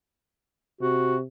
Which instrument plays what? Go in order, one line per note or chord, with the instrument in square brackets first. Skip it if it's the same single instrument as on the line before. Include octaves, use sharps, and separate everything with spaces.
[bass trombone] C3 [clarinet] F#4